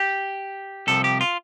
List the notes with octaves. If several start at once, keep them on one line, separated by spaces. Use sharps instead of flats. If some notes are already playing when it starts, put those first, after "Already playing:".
Already playing: G4
C2 C3 F3 A4
G4
F4